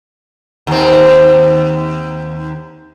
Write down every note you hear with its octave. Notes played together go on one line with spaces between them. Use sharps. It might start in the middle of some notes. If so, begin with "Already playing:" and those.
D#2 C4